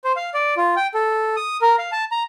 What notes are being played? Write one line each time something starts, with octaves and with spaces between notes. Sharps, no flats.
C5
F5
D5
F4
G5
A4
D#6
A#4
F5
A5
A#5